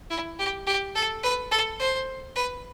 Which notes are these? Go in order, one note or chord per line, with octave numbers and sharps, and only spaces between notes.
E4
G4
G4
A4
B4
A4
C5
B4